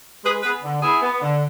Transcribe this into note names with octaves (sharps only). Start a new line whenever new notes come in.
G#3 G#4 B4
B3 G#4 B4
D3
B3 E4 G#4
B3
D3